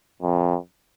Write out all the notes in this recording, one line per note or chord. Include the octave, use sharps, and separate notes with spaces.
F2